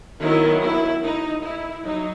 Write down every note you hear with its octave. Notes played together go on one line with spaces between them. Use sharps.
D#3 F#3 B3 E4
E4
D#4
E4
F#3 D#4